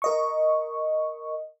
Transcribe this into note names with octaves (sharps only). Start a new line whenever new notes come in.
A#4 D#5 C#6